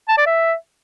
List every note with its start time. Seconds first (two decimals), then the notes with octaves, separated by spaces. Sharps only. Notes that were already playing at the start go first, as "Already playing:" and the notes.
0.09 A5
0.17 D5
0.26 E5